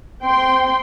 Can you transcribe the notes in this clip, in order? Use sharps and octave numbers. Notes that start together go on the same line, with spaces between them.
C4 G5 C6